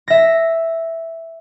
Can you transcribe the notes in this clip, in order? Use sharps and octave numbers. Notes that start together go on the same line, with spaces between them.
E5 A#6